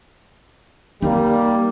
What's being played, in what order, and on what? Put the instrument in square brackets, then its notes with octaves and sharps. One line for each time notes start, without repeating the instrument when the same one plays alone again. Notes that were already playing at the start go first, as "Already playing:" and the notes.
[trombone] G3 [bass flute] A#3 [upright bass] D#4